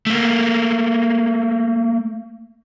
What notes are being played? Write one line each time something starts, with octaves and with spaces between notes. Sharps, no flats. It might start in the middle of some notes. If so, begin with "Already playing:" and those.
A3 A#3